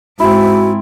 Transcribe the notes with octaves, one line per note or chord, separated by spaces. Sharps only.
G#2 C4 E4 F#4